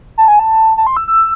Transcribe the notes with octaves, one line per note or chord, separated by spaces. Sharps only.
A5
G#5
A5
A5
C6
E6
E6